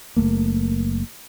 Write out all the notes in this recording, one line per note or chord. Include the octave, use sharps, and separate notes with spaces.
F#1 A2 A3 A#3